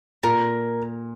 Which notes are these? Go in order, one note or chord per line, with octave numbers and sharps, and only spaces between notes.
A#2 A#4